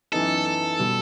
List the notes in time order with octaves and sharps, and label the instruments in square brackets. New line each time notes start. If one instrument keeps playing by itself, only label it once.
[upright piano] F#2 E3 B3 D#4 [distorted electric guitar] A4
[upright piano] B2 G3